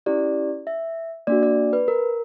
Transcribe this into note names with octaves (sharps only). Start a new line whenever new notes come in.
C#4 E4 G4 D5
E5
A#3 D4 F#4 D5
D5
B4
A#4